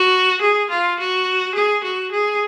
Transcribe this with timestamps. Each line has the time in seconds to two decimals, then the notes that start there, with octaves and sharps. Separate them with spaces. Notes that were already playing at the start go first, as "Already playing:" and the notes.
Already playing: F#4
0.42 G#4
0.70 F4
1.00 F#4
1.55 G#4
1.84 F#4
2.12 G#4